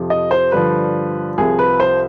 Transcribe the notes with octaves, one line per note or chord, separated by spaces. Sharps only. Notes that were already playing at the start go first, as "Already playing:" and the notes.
Already playing: F2 C3 F3
D#5
C5
G2 D3 F3 B4
C2 C3 F3 G#4
B4
C5